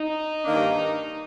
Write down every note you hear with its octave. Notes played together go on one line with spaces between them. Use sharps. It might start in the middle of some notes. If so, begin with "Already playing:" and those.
Already playing: D#4
G2 D#3 A#3 D4